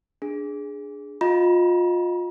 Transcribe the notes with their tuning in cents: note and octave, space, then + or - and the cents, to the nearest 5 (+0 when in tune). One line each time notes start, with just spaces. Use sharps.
D4 +0 G#4 +0
F4 +25 D#5 +0 A#5 +45